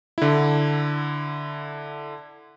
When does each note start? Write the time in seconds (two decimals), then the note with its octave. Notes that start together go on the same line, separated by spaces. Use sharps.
0.18 D3 E4